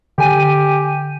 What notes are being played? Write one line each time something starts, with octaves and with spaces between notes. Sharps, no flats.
D3 G4 G#5 D#7